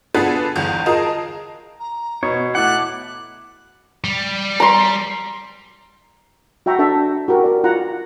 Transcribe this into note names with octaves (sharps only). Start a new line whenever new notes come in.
B3 D4 F4 G#4 A4 B4
G1 E2
F4 G#4 A#4 D#5 A5
A#5
B2 C#5
A3 E4 F#5 D6 F#6
G3
A#5 C6
F#4 E5 G5 A#5 C#6
D4 A4 E5 A5
F#4 G4 A#4
A#4 D5
F4 F#5 A#5